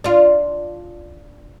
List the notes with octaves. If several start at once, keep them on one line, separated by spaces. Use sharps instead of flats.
D4 F4